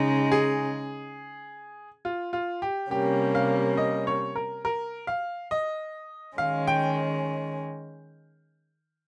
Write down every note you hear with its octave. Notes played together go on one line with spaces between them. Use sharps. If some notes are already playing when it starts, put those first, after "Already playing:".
Already playing: C#3 G#3 D#4
G#4
F4
F4
G4
C3 G3 A#3 C#4 G4
F5
D#5
C#5
A#4
A#4
F5
D#5
D#3 G#3 C#4 F5
G5